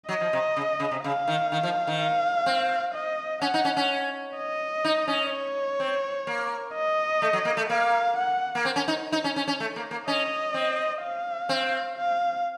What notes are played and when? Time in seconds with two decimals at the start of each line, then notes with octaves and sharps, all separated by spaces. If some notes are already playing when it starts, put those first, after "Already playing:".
0.09 F#3 D#5
0.21 F3
0.33 C3
0.57 C#3
0.80 C#3
0.91 C3
1.04 C#3 F5
1.28 D#3
1.52 D#3
1.63 F3
1.87 D#3
1.99 F5
2.46 C4
2.94 D#5
3.41 C#4 F#5
3.54 D#4
3.65 C#4
3.77 C#4
4.37 D#5
4.84 D#4
5.08 C#4
5.31 C#5
5.80 C4
6.27 A#3
6.74 D#5
7.22 A3
7.33 F#3
7.45 A#3
7.57 A3
7.69 A#3 F5
8.17 F#5
8.55 A#3
8.65 C4
8.76 C#4
8.88 D#4
9.12 D#4
9.24 C#4
9.36 C#4
9.48 C#4
9.60 A3
9.76 A#3
9.91 A#3
10.07 C#4 D#5
10.54 C4
11.02 F5
11.49 C4
11.98 F5